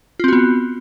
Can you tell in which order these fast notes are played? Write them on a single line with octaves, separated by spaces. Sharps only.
F4 C4 F#4 B3